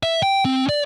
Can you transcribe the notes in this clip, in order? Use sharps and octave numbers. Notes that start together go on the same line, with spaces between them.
E5
G5
C4
D5